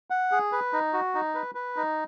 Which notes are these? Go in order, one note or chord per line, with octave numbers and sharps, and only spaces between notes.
F#5
G#4
B4
D#4
F#4
D#4
B4
B4
D#4